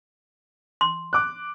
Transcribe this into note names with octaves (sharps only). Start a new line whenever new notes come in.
C6
D6 F#6